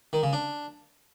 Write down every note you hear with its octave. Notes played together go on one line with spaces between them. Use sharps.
D#3
C#3
D4